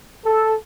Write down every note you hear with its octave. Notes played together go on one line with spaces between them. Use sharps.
A4